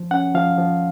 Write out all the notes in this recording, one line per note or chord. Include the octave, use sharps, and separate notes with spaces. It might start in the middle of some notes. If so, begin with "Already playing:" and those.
Already playing: F3
C#4 F#5
F3 F5
F3